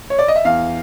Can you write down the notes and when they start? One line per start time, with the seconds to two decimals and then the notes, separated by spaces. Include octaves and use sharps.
0.10 C#5
0.19 D5
0.28 D#5
0.36 E5
0.45 E2 F5